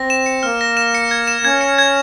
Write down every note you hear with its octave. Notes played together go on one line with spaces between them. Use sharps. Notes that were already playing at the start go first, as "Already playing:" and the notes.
Already playing: C4 A#6
E7
C#7
A#3 F6
A#6
E7
C#7
G#6
E7
C#4 G#6
C#7
G#6